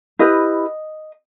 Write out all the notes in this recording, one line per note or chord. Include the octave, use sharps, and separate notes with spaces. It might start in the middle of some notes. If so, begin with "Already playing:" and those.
E4 G4 B4 D#5